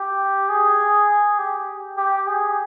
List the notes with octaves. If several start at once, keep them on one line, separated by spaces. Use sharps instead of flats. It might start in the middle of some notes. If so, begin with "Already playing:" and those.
Already playing: G4
G#4
G4
G4
G#4